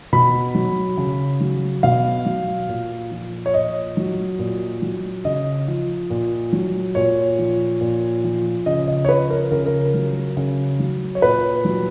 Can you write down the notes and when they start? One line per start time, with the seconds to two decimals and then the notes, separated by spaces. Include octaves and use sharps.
0.13 B2 B5
0.55 F#3
0.97 C#3
1.40 F#3
1.83 B2 F5
2.26 F#3
2.69 A#2
3.11 F3
3.46 C#5
3.54 A#2 D#5
3.97 F#3
4.39 A#2
4.82 F#3
5.25 C#3 D#5
5.68 F3
6.10 A#2
6.53 F#3
6.95 A#2 C#5
7.39 F3
7.81 A#2
8.24 F3
8.66 C#3 D#5
8.88 D#5
9.05 C#5
9.09 F3 B4
9.30 A#4
9.51 C#3 A#4
9.66 A#4
9.94 F#3
10.37 C#3
10.79 F#3
11.15 C#5
11.22 A#2 B4
11.65 F#3